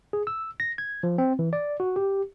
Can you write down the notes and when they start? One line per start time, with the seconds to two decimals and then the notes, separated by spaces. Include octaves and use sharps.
0.13 G#4
0.27 E6
0.60 A#6
0.78 G#6
1.03 F3
1.18 C4
1.39 E3
1.53 D5
1.80 F#4
1.96 G4